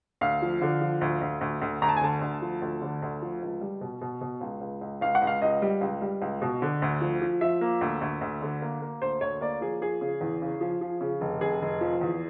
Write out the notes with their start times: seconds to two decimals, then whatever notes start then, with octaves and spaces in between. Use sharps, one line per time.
0.21 D2 F5
0.42 F3
0.62 D3
0.81 F3
1.01 D2
1.21 D2
1.41 D2
1.62 D2
1.82 D2 A#5
1.88 A5
1.96 G#5
2.01 D3 A5
2.21 D2
2.42 F3
2.62 D2
2.82 D3
3.02 D2
3.22 F3
3.42 C#2
3.61 G3
3.81 B2
4.01 B2
4.21 B2
4.41 C#2
4.61 C#2
4.81 C#2
5.01 C#2 F5
5.15 F#5
5.22 C#2
5.27 F5
5.42 C#2 D#5
5.62 G3
5.81 C#2
6.02 G3
6.22 C#2
6.42 B2
6.62 D3
6.82 D2
7.01 F3
7.22 F3
7.41 F3 E5
7.61 A#3
7.81 D2
8.01 D2
8.21 D2
8.42 D3
8.62 A#3
8.82 A#3
9.02 D2 C5
9.21 D2 C#5
9.41 A#3 D5
9.61 F3 G#4
9.81 F3 G#4
10.01 C#3
10.21 E2
10.42 C#3
10.61 F3
10.81 F3
11.01 C#3
11.21 F1
11.41 F1 G#4
11.62 F1
11.81 F3
12.01 E2